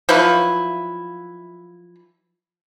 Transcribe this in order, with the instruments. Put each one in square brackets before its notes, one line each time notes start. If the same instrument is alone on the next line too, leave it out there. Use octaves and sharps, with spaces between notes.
[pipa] F3 F#3 E4 B4